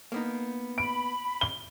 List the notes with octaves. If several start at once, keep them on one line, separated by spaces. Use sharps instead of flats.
A#3 B3 D#4
B5 D7
G7